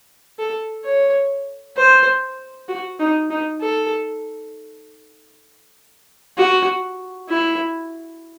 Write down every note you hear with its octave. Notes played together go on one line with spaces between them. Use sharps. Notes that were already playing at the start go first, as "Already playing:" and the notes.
A4
C#5
C5
F#4
D#4
D#4
A4
F#4
E4